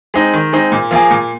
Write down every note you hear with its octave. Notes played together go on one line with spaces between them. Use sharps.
G#3 C4 D#4
D#3
G#3 C4 D#4
A#2
F3 A#3 F4 G#4
A#2